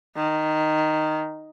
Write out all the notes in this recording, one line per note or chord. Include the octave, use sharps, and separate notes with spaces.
D#3